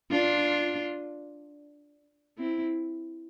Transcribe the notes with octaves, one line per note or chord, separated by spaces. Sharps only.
D4 F4
C4 E4